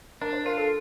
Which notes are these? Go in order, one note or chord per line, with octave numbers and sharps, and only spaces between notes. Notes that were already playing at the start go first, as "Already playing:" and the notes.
D4 A#4
C5
F4 A#4
A4